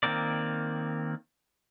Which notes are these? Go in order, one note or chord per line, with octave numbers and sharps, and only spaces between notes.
D#3 A#3 C4 A#4 D5